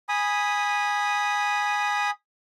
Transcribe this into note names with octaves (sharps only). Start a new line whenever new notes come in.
G#5 B5 D#6